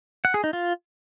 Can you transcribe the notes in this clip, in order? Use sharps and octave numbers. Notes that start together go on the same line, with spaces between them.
F#5
G#4
D#4
F4